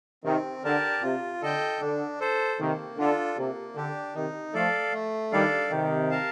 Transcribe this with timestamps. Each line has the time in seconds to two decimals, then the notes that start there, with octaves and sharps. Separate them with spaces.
0.24 C3 D#3 C4
0.64 D3 G4 A#4 D5 A5
1.02 C3 F4
1.42 D3 A4 D#5 G5
1.81 D3 D4
2.20 A4 C5
2.59 C3 D#3 A#3
2.98 D3 D4 F4 A4
3.37 C3 A#3
3.76 D3 D4 G4
4.15 C3 D#3 D#4
4.54 F3 A3 A4 D5 F5
4.93 A3
5.32 D#3 G3 D4 A4 D5 F5
5.71 C3 D#3 G4
6.10 A#4 F5 A5